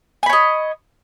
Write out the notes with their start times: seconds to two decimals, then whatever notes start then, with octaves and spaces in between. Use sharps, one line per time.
0.23 G#5
0.26 B5
0.29 C#5
0.33 D#5